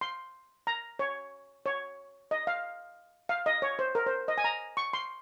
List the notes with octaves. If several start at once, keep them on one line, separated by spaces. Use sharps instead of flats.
C6
A#5
C#5
C#5
D#5
F5
F5
D#5
C#5
C5
A#4
C5
D#5
G#5
A#5
C#6
C6